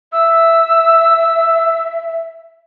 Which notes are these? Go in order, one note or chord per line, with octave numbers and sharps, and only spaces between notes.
E5 E6